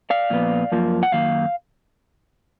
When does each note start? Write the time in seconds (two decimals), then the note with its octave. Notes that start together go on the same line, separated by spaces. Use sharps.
0.10 D5 F5
0.30 A#2 F3 G#3 B3
0.72 F#2 F3 A#3
1.03 F#5
1.12 F#2 D#3 A#3 F5